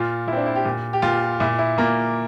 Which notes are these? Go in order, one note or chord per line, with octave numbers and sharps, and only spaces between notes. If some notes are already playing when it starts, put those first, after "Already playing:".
Already playing: A#2 F4
A#2 E4
C4
D4
E4
G4
A#2
G4
A#2 F4
A#2 E4
E4
A#2 A#3